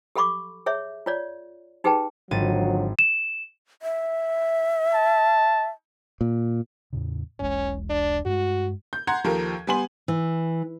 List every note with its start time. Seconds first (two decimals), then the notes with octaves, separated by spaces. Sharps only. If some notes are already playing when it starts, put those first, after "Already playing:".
0.16 G4 A4 F5 B5 C#6 D6
0.66 G#4 C#5 E5
1.06 F4 C#5 D5
1.84 D#4 G4 G#4 B4 G5 A5
2.31 G#1 D3 F3 F#3 A6 D#7
2.99 E7
3.82 E5
4.94 A5
6.21 A#2
6.93 E2 A2 C#3
7.39 E1 B1 G#3 C#4
7.89 D4
8.26 G2 G#3 F#4
8.93 G6
9.07 F#5 A#5 C6 G#6
9.24 D#2 F3 G4 A4 A#4
9.67 G3 B3 G#5 C6 F#7
10.08 E3